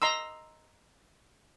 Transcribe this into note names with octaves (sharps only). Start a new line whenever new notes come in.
D#5 A#5 C6 E6